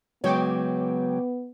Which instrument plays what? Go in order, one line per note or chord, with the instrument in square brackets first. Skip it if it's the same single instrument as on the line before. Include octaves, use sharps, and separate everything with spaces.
[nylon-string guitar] C#3 F#3 G#3 [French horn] B3 [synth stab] C#5 G5 D6